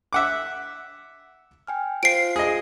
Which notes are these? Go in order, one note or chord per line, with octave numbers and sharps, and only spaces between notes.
E5 F#5 D6
G5 G#5 F6
F4 C5 F5 C7 D7
G#4 D#5